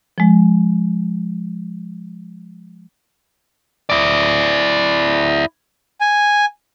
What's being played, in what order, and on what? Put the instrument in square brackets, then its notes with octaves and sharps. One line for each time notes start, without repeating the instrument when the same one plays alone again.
[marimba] F3 G#3
[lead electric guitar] E4 D5
[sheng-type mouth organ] G#5